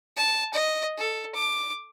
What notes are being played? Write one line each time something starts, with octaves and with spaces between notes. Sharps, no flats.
A5
D#5
A4
D6